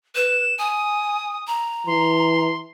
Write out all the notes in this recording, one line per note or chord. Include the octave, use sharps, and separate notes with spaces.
B4 E7
G#5 D#6
A#5
E3 C6